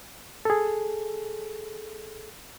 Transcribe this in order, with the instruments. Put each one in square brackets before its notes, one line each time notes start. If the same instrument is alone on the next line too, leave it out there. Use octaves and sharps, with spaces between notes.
[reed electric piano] G#4 A4